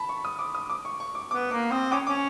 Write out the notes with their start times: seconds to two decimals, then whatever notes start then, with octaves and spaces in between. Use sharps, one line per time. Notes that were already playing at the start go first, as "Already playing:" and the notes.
Already playing: A5 B5
0.09 C#6
0.25 D#6
0.39 D6
0.55 D#6
0.70 D6
0.85 C#6
1.00 C#6
1.15 D6
1.31 B3 D6
1.51 A#3 D6
1.71 C4 D#6
1.92 C#4 D6
2.07 C#4 D6